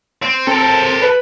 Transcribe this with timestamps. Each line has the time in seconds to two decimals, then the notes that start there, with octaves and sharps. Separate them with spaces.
0.22 C4
0.47 C4 A4 A#4
1.02 B4